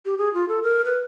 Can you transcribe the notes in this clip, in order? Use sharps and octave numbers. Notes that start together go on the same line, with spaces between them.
G4
G#4
F4
A4
A#4
B4